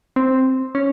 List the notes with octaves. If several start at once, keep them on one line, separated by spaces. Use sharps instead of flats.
C4
C#4